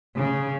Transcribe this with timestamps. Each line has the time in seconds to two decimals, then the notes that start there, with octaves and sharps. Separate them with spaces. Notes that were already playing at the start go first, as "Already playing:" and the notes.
0.18 C#3